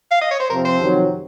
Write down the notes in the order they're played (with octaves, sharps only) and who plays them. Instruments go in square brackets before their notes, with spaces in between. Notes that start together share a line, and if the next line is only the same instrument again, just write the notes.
[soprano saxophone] F5
D#5
C#5
C5
[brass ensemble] F2 C3 F3 C4 [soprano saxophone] A#4
[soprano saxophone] C5
[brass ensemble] F2 C3 D#3 F#3